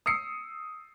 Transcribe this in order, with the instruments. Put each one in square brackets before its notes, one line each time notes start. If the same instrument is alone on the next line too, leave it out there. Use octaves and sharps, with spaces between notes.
[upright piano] D#6 E6 C7 C#7